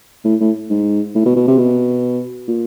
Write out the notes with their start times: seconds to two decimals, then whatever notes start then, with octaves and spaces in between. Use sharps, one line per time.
0.25 A2
0.40 A2
0.70 G#2
1.15 A2
1.26 B2
1.36 B2
1.47 C3
1.59 B2
2.48 A#2